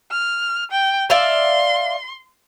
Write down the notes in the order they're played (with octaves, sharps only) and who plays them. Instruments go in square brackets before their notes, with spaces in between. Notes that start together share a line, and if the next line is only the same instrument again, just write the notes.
[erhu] F6
G5
[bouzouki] D5 E5 F5 [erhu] C6